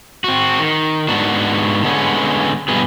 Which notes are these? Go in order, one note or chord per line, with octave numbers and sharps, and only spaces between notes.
C4 F#4
D#3
G#2 B3 D4 F#4
D3 G#3 B3 C#4
G2 B2 B3 G#4